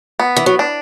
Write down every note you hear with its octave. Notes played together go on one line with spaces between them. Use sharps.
B3
E3
F#3
D4